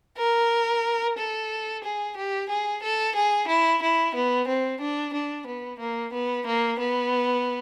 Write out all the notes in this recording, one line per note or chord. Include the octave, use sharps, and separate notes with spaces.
A#4
A4
G#4
G4
G#4
A4
G#4
E4
E4
B3
C4
D4
D4
B3
A#3
B3
A#3
B3